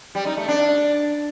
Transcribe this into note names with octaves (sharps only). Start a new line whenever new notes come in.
G3
D#4
A3
D4